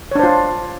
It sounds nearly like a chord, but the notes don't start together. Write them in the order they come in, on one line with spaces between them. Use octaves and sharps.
C#5 D4 C5 F4